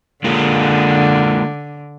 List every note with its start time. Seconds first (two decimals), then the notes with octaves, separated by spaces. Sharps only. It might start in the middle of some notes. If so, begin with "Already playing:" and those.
0.24 D3 G#3 A#3 F4